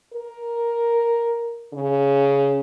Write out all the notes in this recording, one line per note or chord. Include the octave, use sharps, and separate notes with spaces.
A#4
C#3